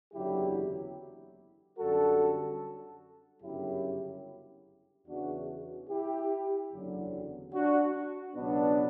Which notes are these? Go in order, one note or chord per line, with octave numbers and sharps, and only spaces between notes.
F#1 E2 D3 F#3 E4 G4
F#2 D3 G3 F#4 A4
G1 F#2 C#3 F#3 E4 G4
E2 C#3 E3 D4 F#4
E4 G4
F#1 E2 D3 F#3
D4 F#4
C#2 B2 F#3 B3 D4